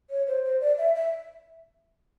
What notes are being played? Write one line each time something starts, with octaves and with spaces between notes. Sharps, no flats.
C#5
C5
C5
D5
E5
E5